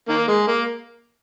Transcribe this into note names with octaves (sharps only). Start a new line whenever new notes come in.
D#3 A#3
G#3
A#3